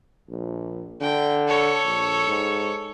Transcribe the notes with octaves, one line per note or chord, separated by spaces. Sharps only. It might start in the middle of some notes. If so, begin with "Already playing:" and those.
A#1
D3 G5
A4 C#5
A#1
G#2